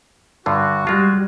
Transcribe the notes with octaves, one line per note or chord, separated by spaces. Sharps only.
G2 D3 F4 F#4
G3 G#3 F4